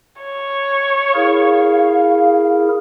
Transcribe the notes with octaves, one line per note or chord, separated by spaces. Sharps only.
C#5
E4 G#4 A#4 F5